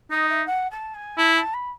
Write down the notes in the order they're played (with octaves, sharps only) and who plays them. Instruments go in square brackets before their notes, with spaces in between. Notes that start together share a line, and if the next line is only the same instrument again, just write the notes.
[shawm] D#4 [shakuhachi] D#5
[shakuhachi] E5
F#5
A5
G#5
[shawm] E4 [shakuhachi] A5
[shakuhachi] A5
B5